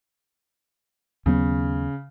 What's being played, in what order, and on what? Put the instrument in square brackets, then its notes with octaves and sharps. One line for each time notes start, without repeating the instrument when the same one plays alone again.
[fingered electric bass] D#2 F#3 B3 [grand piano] C#3